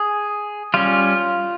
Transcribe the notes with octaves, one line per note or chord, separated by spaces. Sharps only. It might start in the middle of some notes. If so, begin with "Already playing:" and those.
Already playing: G#4
G3 C#4 F4